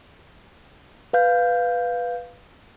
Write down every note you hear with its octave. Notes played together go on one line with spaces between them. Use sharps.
B4 F5 G6